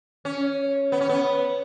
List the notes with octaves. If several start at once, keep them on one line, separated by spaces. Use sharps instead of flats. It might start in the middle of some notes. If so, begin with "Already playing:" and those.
C#4
B3
C#4
B3